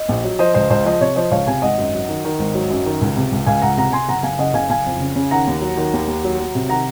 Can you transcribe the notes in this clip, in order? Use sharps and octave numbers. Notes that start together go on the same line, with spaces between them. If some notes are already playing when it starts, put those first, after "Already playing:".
Already playing: D#5
A#1
F#3
F3 C5 D#5
C#2 C5 D#5
C#2 C5 D#5
F3 C5 D#5
C3 C#5
F3 C5 D#5
C#2 C#5 F5
C3 F5 G#5
G#1 D#5 F#5
F#2
F#3
D#3
D#3
G#1
F#3
F#2
D#3
C#2
C3
C#2
C#2 F5 G#5
C#2 F#5 A#5
C3 F#5 A#5
C3 G#5 C6
F#1 F#5 A#5
F#1 F5 G#5
C#3 D#5 F#5
F#1 F5 G#5
F#1 F5 G#5
F2
C#3
C#3
D#3 F#5 A#5
D#2
F#3
D#3
D#2
D#2
F#3
F#3
C3
D#3 F#5 A#5